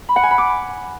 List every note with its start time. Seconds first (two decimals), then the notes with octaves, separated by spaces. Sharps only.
0.09 B5
0.16 F#5
0.23 G#5
0.31 B5
0.38 D6